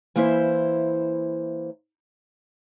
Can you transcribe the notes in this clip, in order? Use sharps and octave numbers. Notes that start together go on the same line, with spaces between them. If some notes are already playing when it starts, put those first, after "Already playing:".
E3 A#3 E4 C5 E5